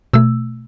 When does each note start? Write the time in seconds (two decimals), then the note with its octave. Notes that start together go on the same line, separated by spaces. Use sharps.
0.13 B2 A3 E6